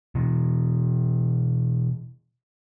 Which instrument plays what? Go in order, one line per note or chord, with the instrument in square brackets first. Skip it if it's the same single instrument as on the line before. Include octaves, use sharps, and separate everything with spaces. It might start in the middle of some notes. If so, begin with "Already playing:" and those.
[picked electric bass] B2 E3